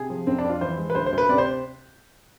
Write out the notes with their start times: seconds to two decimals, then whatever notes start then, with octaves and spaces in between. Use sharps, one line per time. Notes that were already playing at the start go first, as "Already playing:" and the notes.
Already playing: C3 G#4
0.10 F3
0.27 F2 C4
0.38 D4
0.44 F2 F4
0.61 E3 C5
0.78 G#3
0.90 B4
0.95 D2 C5
1.06 C5
1.12 D2
1.18 B4
1.29 C3 D5
1.38 C5